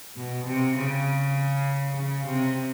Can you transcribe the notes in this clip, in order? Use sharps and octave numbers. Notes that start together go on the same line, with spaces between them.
B2
C3
C#3
C#3
C3